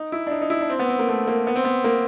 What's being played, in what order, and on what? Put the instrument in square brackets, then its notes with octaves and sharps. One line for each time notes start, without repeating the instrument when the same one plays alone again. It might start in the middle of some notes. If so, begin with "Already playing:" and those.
Already playing: [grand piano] D#4
E4
D4
D#4
D#4
E4
D4
C4
B3
C4
A#3
A3
A#3
B3
C4
B3
A#3